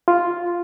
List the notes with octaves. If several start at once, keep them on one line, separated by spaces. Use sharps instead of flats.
F4